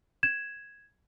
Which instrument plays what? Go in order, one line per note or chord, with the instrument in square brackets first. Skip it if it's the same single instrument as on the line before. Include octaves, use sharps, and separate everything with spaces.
[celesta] G#6 E7